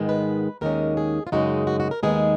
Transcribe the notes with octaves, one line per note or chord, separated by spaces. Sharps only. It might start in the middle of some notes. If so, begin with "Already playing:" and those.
Already playing: G#2 D#3 G#3 B3
B4
D#2 D#3 G#3 C#4 A#4
G#4
F4
F#2 C#3 G#3 D#4 F#4
F#4
F#4
A#4
D#2 D#3 G#3 B3 D#4 G#4